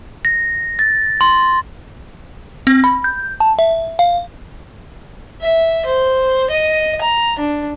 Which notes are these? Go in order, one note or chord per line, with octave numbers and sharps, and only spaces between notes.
A#6
A6
C6
C4
B5
G6
A5
E5
F5
E5
C5
D#5
A#5
D4